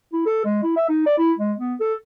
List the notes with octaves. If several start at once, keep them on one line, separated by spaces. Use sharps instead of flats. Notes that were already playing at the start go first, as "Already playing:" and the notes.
E4
A4
G#3
E4
E5
D#4
D5
E4
G#3
B3
A4